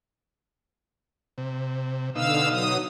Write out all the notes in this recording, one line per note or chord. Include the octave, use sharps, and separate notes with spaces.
C3
B2 D3 D#4 F5 E6
F#3 D#6